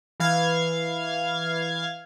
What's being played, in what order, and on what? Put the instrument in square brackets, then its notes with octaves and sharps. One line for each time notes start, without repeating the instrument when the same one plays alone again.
[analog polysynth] E3 F5 G#6